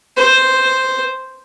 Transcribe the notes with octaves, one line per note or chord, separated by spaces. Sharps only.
C5